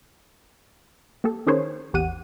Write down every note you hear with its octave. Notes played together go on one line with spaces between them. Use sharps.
A#3 G4 A4
D#3 C#4 G#4 A#4 C5 C#5
A1 E2 G4 F#5 D#7